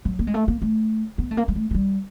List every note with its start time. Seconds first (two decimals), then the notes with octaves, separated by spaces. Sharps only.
0.05 F#3
0.19 A#3
0.27 G#3
0.34 A3
0.48 A#3
0.62 A3
1.18 B3
1.31 A3
1.37 A#3
1.48 G#3
1.56 A3
1.71 G#3
1.74 G3